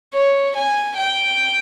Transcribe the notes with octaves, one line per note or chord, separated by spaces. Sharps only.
C#5
G#5
G5